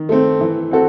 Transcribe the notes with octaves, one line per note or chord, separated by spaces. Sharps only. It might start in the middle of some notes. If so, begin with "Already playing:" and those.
Already playing: D#3
A3 C4
E3
C4 F#4 A4